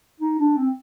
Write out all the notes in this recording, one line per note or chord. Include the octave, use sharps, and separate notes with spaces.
D#4
D4
C4